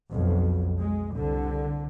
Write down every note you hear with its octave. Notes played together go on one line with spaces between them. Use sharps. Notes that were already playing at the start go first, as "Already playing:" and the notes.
B1 F2
G#3
C2 D3